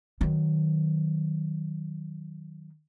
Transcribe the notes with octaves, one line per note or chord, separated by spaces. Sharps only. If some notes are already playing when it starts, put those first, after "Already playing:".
D#3 F#3